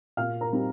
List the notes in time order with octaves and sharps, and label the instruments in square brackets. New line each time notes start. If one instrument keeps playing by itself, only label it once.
[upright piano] A#2 F5 F6
A#4 A#5
G3 C4 D#4